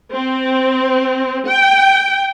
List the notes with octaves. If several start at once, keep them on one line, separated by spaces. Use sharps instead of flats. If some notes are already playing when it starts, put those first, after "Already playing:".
C4
G5